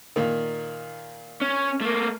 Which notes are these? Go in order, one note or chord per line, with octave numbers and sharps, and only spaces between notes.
A#2 D#3
C#4
A3 A#3